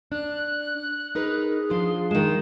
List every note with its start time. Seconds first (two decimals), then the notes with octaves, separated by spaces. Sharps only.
0.12 D4 F#6
1.15 D#4 G#4 A#4 B4
1.70 F3 D4 F4 C6
2.11 D#3 G#3 E7